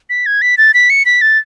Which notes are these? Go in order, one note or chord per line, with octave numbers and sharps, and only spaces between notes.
B6
G#6
B6
A6
B6
C#7
B6
A6